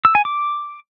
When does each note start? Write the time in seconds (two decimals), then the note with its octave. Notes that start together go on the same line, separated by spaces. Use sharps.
0.05 E6
0.15 G#5
0.25 D6